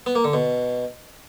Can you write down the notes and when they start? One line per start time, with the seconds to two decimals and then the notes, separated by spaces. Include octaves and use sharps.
0.06 B3
0.15 A#3
0.24 D3
0.33 B2